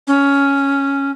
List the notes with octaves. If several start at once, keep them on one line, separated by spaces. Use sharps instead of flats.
C#4